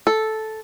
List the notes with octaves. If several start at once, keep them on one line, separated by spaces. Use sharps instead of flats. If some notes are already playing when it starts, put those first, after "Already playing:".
A4